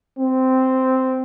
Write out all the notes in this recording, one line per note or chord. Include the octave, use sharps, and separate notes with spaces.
C4